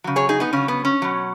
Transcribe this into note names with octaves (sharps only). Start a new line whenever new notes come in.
C#3 F#3
G#4 C#5
D#4 G#4
B3 D#4
C#3 F#3 C#4
B3
C#4
B2 F#3